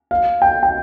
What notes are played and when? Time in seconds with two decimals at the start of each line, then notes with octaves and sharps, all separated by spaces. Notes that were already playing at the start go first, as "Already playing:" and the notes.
0.11 F5
0.42 G5
0.63 G5